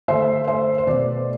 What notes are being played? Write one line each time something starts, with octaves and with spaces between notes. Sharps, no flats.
D3 A3 C5 E5
C5 E5
C5
B2 A3 B4 D5